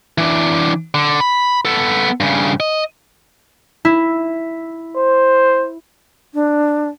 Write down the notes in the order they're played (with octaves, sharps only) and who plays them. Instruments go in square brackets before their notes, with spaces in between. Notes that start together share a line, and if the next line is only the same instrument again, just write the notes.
[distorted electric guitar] E3 D4
D3
B5
B3 A4
G2 C#3
D#5
[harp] E4
[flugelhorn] C5
[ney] D4